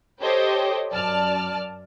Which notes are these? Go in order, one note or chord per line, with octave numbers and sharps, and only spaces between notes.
G4 A4 C5 C#5 D#5 G5
F#2 D5 A5 F6